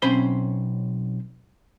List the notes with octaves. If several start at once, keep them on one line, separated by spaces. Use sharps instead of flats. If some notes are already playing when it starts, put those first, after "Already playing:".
B1 C4 C#4 C5 B5 C6